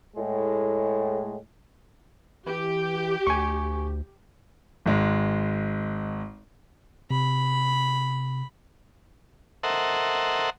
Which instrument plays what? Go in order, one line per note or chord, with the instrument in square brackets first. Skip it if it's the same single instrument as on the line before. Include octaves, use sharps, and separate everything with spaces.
[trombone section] A2 G#3
[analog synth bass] E3 [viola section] G4
[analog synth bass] D2 [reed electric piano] G#5 C#6
[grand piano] G#1 G#3
[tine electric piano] C3 [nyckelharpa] B5
[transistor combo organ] A4 A#4 C5 D#5 E5 F#5